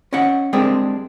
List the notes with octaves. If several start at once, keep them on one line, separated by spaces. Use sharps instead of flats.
C#4 D#5 F#5
G3 G#3 C4 D4 G#4 A#4